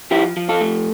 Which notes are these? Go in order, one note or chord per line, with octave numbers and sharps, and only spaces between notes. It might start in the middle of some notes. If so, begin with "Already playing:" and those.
F3 E4 G4
F3
F4 A4
A3